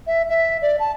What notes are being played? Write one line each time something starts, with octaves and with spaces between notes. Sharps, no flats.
E5
E5
D5
A5